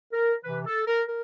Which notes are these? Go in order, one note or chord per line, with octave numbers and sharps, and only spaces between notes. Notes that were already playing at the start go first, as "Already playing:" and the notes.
A#4
C3 E3 B4
A4
A#4
A#4